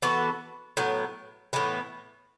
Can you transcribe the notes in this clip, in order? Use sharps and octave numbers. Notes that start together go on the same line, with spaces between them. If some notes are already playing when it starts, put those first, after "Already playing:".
E3 B3 F#4 A4
A2 F#3 B3
A2 E3 B3